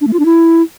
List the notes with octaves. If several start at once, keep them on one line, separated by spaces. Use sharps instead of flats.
D4
A3
F4
D4
E4